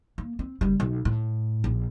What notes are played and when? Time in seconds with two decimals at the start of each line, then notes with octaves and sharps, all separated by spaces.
0.18 A#3
0.39 C4
0.61 F#1 G3
0.80 B1
1.05 A2
1.64 A#1